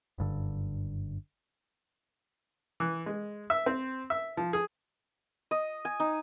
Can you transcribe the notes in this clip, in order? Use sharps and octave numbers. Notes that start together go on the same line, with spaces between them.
F#1 G2 D3
E3
G#3
E5
C4
E5
F3
G#4
D#5
G#5
D#4